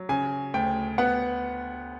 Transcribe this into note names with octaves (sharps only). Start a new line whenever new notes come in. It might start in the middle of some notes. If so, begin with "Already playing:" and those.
Already playing: F#3
C#3 G#5
D2 G5
B3 F#5